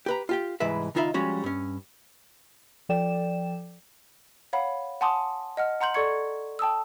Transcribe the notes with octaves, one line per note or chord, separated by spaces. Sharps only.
G4 B4 A#5
F4 G4 G5
C2 G#2 E3 G#3 B4 E5
C#2 D#3 D#4 F4 E5 B5
F3 G3 G#3 C#4 F#4
G2 C#4
F3 A4 D5 G5 E7
C#5 F5 F#5 B5
F#5 G#5 A5 C6 D6 D#6
D#5 F#5 F6
F#5 A#5 C6 G6 F#7
A4 D5 C#6 G#6 C#7
G5 A5 D#6 E6